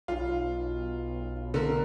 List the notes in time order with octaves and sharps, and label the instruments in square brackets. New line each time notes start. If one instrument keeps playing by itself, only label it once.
[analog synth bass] B1 [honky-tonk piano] F4
[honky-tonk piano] D3 A#4